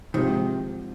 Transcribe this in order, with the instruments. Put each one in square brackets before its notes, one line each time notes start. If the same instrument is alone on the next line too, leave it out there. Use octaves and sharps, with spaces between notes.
[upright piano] G#2 F3 C4 G4 C5 [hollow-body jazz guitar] C3 D#3